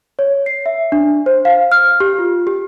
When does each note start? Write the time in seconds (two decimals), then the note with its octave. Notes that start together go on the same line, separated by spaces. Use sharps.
0.19 C#5
0.46 C7
0.66 E5
0.92 D4
1.26 C5
1.45 F5
1.72 F6
2.00 G4
2.19 F4
2.47 G4